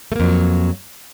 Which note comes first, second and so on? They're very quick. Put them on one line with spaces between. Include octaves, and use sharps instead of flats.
A3 A#3 F2 F#3